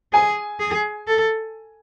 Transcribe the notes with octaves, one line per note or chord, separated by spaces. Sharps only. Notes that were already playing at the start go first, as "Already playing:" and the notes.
G#4 G#5
G#4
A4